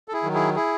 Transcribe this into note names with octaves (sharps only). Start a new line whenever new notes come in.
A4
E4 G#4
D#3 F#3
E4 G#4
E4 G#4